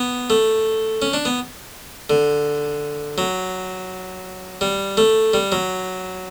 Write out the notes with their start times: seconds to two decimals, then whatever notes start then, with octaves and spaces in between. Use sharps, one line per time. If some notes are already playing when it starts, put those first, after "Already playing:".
Already playing: B3
0.30 A3
1.02 C#4
1.13 D4
1.25 B3
2.10 D3
3.18 F#3
4.61 G3
4.97 A3
5.34 G3
5.52 F#3